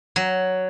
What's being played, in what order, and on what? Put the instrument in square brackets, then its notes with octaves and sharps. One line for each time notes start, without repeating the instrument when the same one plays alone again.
[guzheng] F#3